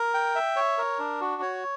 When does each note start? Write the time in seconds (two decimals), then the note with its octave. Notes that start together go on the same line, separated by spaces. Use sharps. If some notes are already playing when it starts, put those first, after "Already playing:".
Already playing: A#4
0.14 G5
0.35 E5
0.56 C#5
0.78 A#4
0.99 D4
1.21 F#4
1.42 C#5